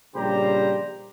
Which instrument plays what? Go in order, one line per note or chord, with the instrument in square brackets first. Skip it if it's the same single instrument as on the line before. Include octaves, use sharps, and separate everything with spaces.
[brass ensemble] A#1 C#3 G3 G4 C5 A#5